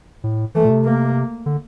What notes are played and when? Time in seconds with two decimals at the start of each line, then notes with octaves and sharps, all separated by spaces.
0.24 A2
0.55 E3 A3
0.65 A#2
0.70 C3
0.84 A#3
1.46 D3